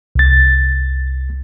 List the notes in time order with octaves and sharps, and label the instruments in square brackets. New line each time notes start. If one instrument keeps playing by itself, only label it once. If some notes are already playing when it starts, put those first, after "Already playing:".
[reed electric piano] C2 A6